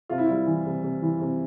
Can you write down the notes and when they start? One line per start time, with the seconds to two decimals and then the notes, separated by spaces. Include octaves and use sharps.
0.09 C3 F4
0.18 E4
0.26 G3 F4
0.46 E3
0.66 C3
0.83 C3
1.02 E3
1.20 C3